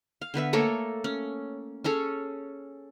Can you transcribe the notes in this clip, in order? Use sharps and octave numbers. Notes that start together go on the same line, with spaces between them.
F5
D3 B3 B4 E5
A3 A#3 A4 C#5
C#4
C#4 G#4 A4 C#5